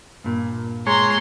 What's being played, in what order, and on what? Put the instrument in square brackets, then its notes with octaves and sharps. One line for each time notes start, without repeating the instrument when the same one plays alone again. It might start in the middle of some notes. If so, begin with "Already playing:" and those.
[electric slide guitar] G2 A#2
[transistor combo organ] G#3 C#5 [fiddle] A#5 C6